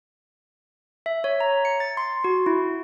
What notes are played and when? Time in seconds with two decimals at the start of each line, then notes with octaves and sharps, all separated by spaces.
1.06 E5
1.24 C#5
1.40 A#5
1.65 C#7
1.80 A6
1.97 C6
2.24 F#4
2.46 E4